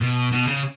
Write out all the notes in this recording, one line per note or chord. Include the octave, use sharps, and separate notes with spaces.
B2
B2
C#3